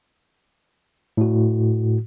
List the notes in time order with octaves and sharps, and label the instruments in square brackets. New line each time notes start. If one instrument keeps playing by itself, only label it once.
[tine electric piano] A2 F#4